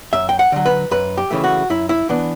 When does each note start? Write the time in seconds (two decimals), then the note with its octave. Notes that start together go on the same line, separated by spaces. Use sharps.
0.13 F#2 E5
0.29 G5
0.39 F#5
0.52 D3 F#3
0.66 B4
0.91 F#2 B4
1.17 G4
1.31 C#3 E3 A3
1.44 F#4
1.70 F#2 E4
1.89 E4
2.09 E3 B3 D4